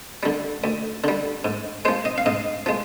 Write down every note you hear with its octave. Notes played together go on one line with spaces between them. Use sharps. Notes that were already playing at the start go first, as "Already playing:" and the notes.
D3 G3
D2
D3 G3
G#2
F3 G#3 C5
D#5
F5
G#2 D#5
F3 G#3